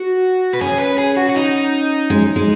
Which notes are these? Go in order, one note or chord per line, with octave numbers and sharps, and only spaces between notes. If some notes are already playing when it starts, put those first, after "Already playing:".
Already playing: F#4
B4
C#4 G#4
B4
G#4
F#4
F#4
D#4
G#3
G#3